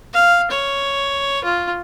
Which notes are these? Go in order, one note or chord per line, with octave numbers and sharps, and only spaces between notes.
F5
C#5
F4